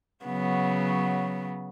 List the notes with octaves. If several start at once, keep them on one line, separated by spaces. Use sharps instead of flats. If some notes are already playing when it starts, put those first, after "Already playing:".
C#3 F#3 B3